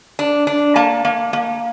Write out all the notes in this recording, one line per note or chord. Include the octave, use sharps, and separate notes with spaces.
D4
D4
A#3 A5
A#3
A#3